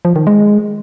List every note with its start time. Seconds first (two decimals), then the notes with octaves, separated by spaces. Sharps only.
0.05 F3
0.16 D#3
0.27 G#3